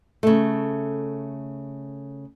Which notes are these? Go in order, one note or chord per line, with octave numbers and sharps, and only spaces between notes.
C#3 A3